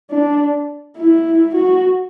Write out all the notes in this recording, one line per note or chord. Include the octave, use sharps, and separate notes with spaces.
D4
E4
F#4